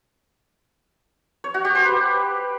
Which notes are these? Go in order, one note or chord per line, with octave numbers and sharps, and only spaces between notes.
C#5
F#4
G4
C5
B4